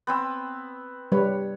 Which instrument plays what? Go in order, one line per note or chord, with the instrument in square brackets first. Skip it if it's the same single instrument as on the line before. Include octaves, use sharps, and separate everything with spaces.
[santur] B3 C4 E6
[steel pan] G3 B4 [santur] C#5